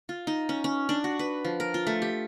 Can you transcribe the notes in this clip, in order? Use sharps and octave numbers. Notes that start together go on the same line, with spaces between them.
F4
D#4
C#4
C#4
D4
F#4
B4
F3
A#4
F4
A3
G4